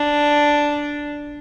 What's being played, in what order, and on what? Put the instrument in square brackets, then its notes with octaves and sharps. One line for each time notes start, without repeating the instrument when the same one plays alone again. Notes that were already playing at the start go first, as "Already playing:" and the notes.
Already playing: [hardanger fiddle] D4